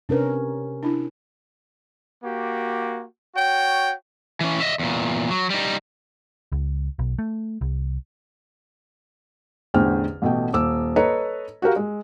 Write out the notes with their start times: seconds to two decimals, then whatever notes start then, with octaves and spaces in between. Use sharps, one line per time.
0.09 C3 C#4 D4 A#4 B4
0.83 D4 E4
2.24 A#3 F#4 G4
3.36 F#4 C#5 G5
4.41 E3 C#4
4.60 D#5 E5
4.79 E2 A#2
5.31 F#3
5.50 G3 D#4
6.52 C#2
6.99 B1
7.19 A3
7.61 C2
9.74 A1 E2 D3 C5 G5 F6
10.22 A1 B2 A3 G5
10.53 D#1 D6 E6
10.96 A4 B4 C#5 D#5 A#5
11.62 F#4 G4 A#4 F5
11.76 G#3